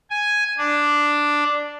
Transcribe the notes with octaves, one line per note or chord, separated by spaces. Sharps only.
G#5
D4